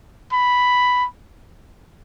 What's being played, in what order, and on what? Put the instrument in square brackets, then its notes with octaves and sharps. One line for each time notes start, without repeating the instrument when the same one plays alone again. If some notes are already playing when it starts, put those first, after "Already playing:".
[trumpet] B5